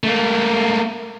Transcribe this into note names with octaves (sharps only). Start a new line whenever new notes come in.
A3 A#3